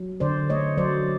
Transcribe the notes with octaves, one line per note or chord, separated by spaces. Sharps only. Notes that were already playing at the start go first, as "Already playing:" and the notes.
Already playing: F#3
D3 C5 D5
A3 C#5 D#5
F#3 C5 D5